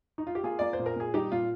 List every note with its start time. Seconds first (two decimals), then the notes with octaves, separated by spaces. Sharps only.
0.18 D#4
0.27 F4
0.35 G4
0.44 A#3 F4 G#4
0.59 A#3 D5
0.73 C5
0.79 A#2
0.86 A#4
0.96 A#2 G#4
1.14 G3 D#4 G4
1.32 A#2 F4